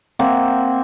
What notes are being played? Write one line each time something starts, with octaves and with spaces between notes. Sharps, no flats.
A#3 C4 E5 F#5